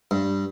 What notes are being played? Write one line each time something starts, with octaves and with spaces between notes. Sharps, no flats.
G2